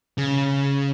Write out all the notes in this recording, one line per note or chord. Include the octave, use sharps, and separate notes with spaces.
C#3